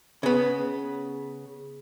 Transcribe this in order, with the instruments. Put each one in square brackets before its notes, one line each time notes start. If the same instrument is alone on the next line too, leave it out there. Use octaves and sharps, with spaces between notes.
[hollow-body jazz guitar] C#3 B3